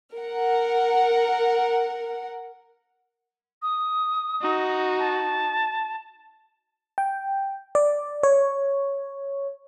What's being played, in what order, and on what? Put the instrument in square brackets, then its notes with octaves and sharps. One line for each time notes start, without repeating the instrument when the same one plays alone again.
[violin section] A#4 F#5
[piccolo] D#6
[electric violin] D#4 F#4
[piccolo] A5
[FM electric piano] G5
D5
C#5